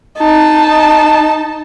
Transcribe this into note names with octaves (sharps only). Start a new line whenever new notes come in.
D#4 A5